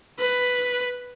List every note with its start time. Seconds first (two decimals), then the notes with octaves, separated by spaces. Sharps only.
0.19 B4